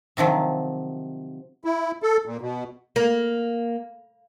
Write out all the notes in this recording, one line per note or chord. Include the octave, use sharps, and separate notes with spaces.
C3 D#3 F3 F#3
E4
A4
A#2
B2
A#3